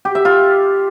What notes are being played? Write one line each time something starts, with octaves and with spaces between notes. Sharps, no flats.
G4
E5
F4